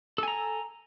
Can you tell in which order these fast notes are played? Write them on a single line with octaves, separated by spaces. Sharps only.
A4 G#5 A#5